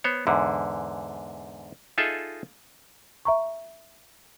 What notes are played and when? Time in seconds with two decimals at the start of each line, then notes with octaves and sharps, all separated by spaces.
0.04 B3 C5 C#5
0.27 E2 G#2 D3
1.98 D#4 F4 G#4 A4 D#5 E5
3.25 E5 A#5 C#6